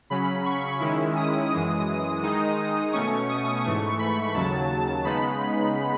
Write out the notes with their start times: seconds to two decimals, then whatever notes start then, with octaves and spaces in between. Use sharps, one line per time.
0.10 C#3 F#3 C#4 B5
0.46 C#6
0.80 D#3 G#3 C#4 E4
1.16 D#6
1.52 F#2 E3 G#3
2.23 D#3 G#3 D#4
2.93 B2 A3 C#4 C#6
3.29 D#6
3.64 G#2 E3 A3 C#6
3.99 B5
4.35 D#2 C#3 F#3 A5
4.70 A5
5.05 C#3 G#3 B3 D#4 B5